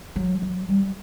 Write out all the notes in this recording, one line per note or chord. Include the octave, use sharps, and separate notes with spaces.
F#3
F#3
G3